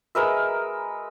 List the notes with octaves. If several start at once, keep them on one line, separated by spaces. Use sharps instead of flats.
G#3 A#4 B4 E5